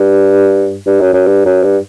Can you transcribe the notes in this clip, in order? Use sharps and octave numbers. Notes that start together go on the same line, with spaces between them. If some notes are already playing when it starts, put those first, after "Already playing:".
Already playing: G2
G2
F#2
F#2
G2
F#2
G2